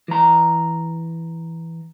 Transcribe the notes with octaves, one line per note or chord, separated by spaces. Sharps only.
E3 A#5